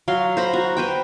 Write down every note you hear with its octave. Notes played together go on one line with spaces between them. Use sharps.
F#3 F5 C6
C5 A#5 B5
F#4
B4 C5 G5